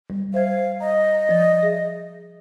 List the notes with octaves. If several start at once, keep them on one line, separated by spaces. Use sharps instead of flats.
G3
C5 E5 F5 G#6
D#5 A#5
F3 D5 A6
G#4 E5